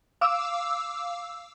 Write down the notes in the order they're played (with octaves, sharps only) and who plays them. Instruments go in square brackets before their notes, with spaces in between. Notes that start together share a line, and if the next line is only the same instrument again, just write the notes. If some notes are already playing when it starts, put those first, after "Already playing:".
[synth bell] F5 D6 E6